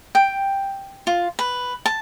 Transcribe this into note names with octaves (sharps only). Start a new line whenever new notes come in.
G5
F4
B4
A5